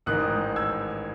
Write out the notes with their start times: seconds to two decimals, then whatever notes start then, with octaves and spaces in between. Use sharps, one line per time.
0.06 A1 G#2 D#3 D#6 F#6
0.56 E6 G#6